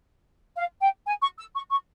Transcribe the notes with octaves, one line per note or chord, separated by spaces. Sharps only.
F5
G5
G#5
C#6
E6
C#6
C#6